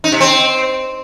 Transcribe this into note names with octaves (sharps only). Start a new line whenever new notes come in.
D#4
C3
C4